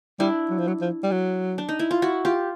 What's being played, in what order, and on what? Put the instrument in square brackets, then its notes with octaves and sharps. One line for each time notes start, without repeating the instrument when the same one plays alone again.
[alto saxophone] G3 [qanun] D4 E4
[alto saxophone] F#3
F3
F#3
F3
G3
F#3
[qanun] D4
D#4
E4
F4
E4 F#4
F4 G4